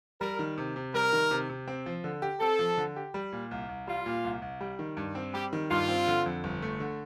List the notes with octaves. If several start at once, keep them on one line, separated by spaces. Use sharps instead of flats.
G3 A#4
D#3
C3
C3
G3 A#4
D#3
C3
C3
C4
F3
D3
G4
C4 A4
F3
D3
G4
G3
A#2
C2
C2
G3 F4
A#2
C2
C2
G3
D#3
G2
C4
G3 G4
D#3
G2 F4
C4
D3
F2
G1
A3
D3